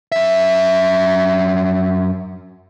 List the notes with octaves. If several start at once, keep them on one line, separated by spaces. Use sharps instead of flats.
F#2 E5